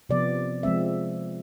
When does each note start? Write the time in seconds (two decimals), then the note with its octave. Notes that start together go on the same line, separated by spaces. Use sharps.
0.09 C3 F3 B3 D5
0.63 F3 G#3 C4 E5